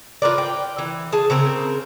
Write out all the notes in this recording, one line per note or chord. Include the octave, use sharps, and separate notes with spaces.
F4 A#4 B4 D5
G5
E3
G#4 A5
C#3 C4 A#4